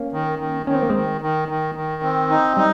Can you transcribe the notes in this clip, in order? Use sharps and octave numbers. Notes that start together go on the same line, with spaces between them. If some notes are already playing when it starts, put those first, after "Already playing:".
Already playing: A#3 C#4
D#3
D#3
D#3 C#4
C4
A#3
D#3 G#3 C4
D#3
D#3
D#3
C4
D#4
G3 D#4